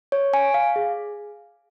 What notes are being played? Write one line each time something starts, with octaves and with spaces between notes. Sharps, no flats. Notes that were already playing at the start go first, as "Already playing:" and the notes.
C#5
G#5
F5
G#4